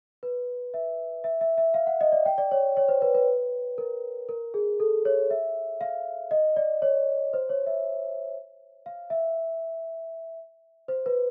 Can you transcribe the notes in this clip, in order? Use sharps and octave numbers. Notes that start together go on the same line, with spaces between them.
B4
E5
E5
E5
E5
F5
F#5
D#5
D5
G5
D5
C#5
C#5
C5
B4
B4
A#4
A#4
G#4
A4
C#5
E5
F5
D#5
D5
C#5
C5
C#5
E5
F5
E5
C5
B4